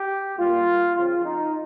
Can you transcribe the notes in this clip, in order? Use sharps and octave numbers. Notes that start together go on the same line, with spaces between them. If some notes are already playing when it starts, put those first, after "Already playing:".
Already playing: G4
A#2 G3 A#3 F4
C#3 F3 C4 F4
D#4